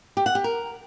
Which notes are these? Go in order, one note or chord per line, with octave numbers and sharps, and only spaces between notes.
G4
F#5
G4
A#4